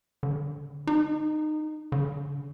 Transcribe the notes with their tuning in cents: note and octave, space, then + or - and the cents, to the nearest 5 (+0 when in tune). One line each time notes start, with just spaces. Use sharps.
D3 +0
D#4 -20
D3 -40